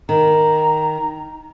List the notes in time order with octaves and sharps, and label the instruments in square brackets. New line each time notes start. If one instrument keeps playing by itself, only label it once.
[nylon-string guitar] D#3 [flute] A#5